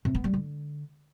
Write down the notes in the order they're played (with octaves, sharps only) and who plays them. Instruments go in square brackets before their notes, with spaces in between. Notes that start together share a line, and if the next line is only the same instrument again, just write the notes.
[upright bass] C3
B3
G3
D3